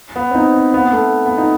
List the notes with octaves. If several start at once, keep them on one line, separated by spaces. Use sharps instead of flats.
B3
C4
D#4
C4
B3
B3
A3
B3
D#4